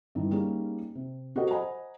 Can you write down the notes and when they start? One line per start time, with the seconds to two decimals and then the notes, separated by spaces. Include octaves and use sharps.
0.15 G2 D#3 E3
0.31 G3 A#3 C#4 D#4 G#4
0.95 C3
1.36 F#4 G4 A4 A#4 C5 D#5
1.50 C5 D#5 F#5 G#5 A#5 B5